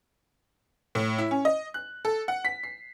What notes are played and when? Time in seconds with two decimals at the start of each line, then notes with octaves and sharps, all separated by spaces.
0.95 A2
1.18 E4
1.31 C#4
1.45 D#5
1.74 F#6
2.05 A4
2.28 F#5
2.45 B6
2.63 C7